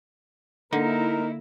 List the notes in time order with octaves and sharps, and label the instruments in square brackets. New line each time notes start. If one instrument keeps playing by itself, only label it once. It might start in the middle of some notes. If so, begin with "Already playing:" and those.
[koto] D3 [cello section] A#3 E4 [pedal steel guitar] D#4 [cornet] A#4